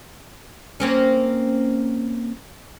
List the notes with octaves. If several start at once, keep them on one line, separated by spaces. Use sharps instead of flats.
A#3 C4 C#4